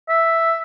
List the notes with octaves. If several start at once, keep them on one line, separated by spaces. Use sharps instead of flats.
E5